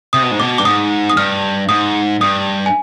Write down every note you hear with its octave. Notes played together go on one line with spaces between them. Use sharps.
C3 D#6
B2
G#2
B2 D6
G2 D6
G#2 D#6
D#6
G2 F6
G#2 D#6
G2 D#6
G#5